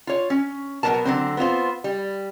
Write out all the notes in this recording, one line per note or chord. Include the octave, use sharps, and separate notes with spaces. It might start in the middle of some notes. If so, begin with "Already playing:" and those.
F4 C#5
C#4
B2 F#3 B3 D4 A#4 A5
D3 F#3 C4
B3 C4 F4 C5
G3